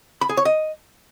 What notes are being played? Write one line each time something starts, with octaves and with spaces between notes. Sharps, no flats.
B5
G#4
C#5
D#5